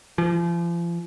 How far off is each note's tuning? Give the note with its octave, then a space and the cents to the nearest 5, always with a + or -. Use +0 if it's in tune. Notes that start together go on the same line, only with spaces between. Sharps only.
F3 -35